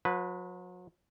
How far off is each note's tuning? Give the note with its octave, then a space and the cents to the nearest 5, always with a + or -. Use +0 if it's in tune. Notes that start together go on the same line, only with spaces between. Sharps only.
F#3 -40 B4 +0